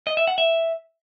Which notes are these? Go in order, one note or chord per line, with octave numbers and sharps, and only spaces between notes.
D#5
E5
F#5
E5